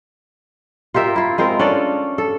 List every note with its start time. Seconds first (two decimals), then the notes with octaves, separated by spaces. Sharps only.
0.94 F4 G4 A#4 E5
1.16 E4 F4
1.38 G#3 C4 F4 A#4
1.59 C#4 D4 A4 D5
2.18 A4